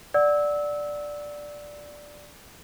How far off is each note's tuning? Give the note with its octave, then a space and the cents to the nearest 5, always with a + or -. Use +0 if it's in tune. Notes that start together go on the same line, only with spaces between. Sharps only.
D5 +0 F#5 +0 E6 -20